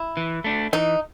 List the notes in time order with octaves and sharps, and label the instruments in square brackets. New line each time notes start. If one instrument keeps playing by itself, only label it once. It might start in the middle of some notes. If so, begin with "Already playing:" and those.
Already playing: [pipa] E4
[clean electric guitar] E3
A3 D4
[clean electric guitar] E3 [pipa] D#4